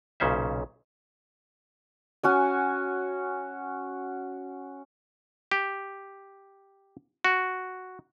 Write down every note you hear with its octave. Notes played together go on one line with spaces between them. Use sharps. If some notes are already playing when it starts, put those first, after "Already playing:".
B1 A#2 C#3 C#4 C5 E5
C#4 F#4 G#5
G4
F#4